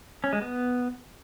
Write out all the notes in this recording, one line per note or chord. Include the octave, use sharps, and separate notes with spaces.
C#4
G#3
B3